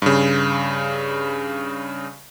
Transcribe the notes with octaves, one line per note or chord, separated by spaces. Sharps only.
G2 C#3